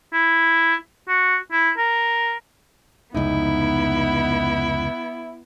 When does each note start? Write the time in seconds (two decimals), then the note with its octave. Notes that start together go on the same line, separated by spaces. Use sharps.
0.13 E4
1.09 F#4
1.52 E4
1.78 A#4
3.14 F1 C#2 B3 D#4 E4